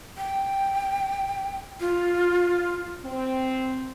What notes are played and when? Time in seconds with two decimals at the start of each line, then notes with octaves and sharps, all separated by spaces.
0.17 G5
1.80 F4
3.04 C4